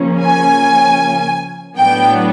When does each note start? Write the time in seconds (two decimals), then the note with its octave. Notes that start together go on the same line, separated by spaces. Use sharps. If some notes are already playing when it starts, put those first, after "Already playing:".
Already playing: C#3 F3 A#3 C#4
0.23 G#5
1.78 A2 F#3 B3 D4 G5